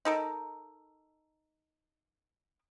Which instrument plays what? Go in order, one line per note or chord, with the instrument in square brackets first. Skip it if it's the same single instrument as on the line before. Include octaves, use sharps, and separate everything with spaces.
[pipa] D#4 A4 A#4